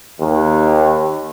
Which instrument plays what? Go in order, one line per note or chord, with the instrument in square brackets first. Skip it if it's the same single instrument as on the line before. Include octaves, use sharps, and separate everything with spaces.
[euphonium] D#2